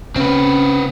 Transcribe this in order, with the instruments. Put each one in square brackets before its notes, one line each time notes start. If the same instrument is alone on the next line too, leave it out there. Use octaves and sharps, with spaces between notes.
[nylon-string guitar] C#3 C#4 [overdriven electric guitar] C4 B4